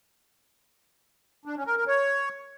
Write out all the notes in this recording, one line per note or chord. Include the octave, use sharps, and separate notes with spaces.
D4
C#4
A#4
A#4
C#5